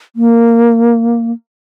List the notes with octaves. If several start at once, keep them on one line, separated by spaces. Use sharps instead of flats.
A#3